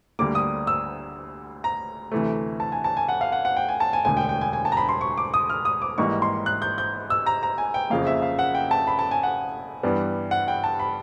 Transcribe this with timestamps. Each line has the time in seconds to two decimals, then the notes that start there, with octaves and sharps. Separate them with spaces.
0.19 D2 D3 G3 A#3 D6
0.35 D#6
0.67 E6
1.64 A#5
2.12 D2 C3 E3 A3
2.60 A5
2.72 G#5
2.84 A5
2.97 G#5
3.08 F#5
3.21 F5
3.32 F#5
3.45 F#5
3.57 G5
3.68 G#5
3.80 A5
3.93 G#5
4.05 E1 D2 D3 G#5
4.17 G5
4.29 G5
4.41 G#5
4.53 G#5
4.65 A5
4.72 A#5
4.77 B5
4.89 C6
5.01 C#6
5.17 D6
5.34 D#6
5.50 F6
5.65 D#6
5.82 D6
5.98 G#1 G#2 E3 G3 A#3 C#6
6.22 C6
6.46 F#6
6.62 G6
6.78 G6
7.10 E6
7.26 A#5
7.43 A#5
7.58 G#5
7.74 G5
7.90 F#1 F2 C#3 F3 A#3 F5
8.07 E5
8.22 F5
8.39 F#5
8.55 G5
8.71 A5
8.87 B5
8.99 A5
9.11 G#5
9.23 F#5
9.83 G2 E3 G3 B3
10.31 F#5
10.48 G5
10.64 A5
10.80 B5